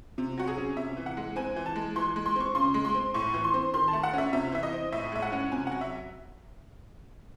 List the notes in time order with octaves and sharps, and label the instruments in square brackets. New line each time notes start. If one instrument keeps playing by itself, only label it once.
[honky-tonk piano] C3
F#3 F#4
G#4
C#4
C3 E5
E3
F#5
G#3
C4 G#5
E3
A5
G#3
E3 C6
G#3
C6
C4 C#6
C#3 C6
G#3
C6
C4
A2 C#6
E3
C6
C4
D#3 C6
A5
A3
F#5
C#4 E5
C3 E5
E3 E5
D#5
C4
A2 E5
G#3 E5
F#5
C#4
C3 G#5
F#3 F#5
E5